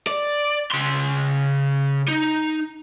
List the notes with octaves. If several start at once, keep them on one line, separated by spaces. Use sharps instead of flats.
D5
C#3 C6
D#4